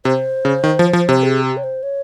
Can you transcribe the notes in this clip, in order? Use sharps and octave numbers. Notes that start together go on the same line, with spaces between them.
C3 C5
C#3
D#3
F3
F3
C3
G#4
G4
C#5
C5
C#5